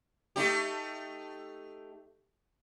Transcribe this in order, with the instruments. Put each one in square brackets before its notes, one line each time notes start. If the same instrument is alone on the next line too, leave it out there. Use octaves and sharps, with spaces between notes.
[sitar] A3 D#4 G4